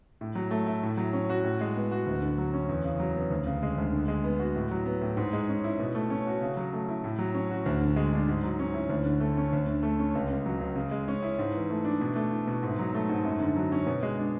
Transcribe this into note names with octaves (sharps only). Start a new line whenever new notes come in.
A2
F#3
A3
E4
A2
F#3
C#4
F#4
A2
G#3
B3
F#4
D2
D3
F#3
C#4
E2
C#3
F#3
B3
D2
C#3
G#3
D2
D3
G#3
B3
F#4
A2
F#3
B3
A2
G#2
G#3
C#4
E4
B2
A3
C#4
F#4
C#3
F#3
A3
E4
A2
F#3
C#4
F#4
D2
D3
G#3
D4
G#2
F#3
C#4
E4
D2
D3
A3
C#4
D2
D3
A3
C#4
C#2
C#3
F#3
C#2
C#3
G#3
C#4
E4
G#2
E3
A3
D4
B2
A3
E4
B2
G#2
F#3
A3
G#2
F#2
D3
F#3
C#4
B2
G#3
D4